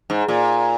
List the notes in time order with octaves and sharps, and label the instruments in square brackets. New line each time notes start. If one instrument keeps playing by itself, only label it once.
[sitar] G#2
A#2